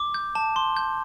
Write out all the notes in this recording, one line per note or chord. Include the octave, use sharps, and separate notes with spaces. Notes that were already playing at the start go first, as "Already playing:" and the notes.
Already playing: D6
G6
A5
C6
G6